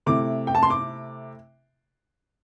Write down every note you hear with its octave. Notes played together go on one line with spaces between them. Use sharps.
C3 A3 E4 D6
G5
A5
C6
D6